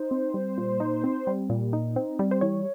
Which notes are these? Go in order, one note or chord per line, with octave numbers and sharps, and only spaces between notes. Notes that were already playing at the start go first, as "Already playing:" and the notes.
Already playing: D#4 C5
C4
G3
A#2
D#4
C4
G3
A#2
D#4
C4
G3
C5
E3 C#5